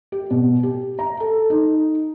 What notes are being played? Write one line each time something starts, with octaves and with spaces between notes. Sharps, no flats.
G4
B2
G4
A#5
A4
D#4